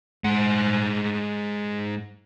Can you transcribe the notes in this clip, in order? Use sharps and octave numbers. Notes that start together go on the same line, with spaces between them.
G#2 F#5